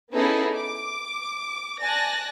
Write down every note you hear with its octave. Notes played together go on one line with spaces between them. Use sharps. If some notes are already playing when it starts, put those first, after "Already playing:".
B3 C#4 D#4 E4 G#4 A4
D6
D5 G#5 A5 F#6 A#6